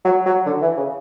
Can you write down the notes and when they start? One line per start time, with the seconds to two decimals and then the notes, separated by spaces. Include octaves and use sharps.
0.05 F#3
0.26 F#3
0.46 D3
0.62 E3
0.77 C#3